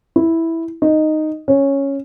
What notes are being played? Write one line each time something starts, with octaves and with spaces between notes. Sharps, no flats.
E4
D#4
C#4